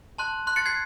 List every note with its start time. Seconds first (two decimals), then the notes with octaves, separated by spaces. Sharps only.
0.18 A5 C6 F#6
0.47 C6 F#6
0.56 A6 C#7
0.66 G#6 C7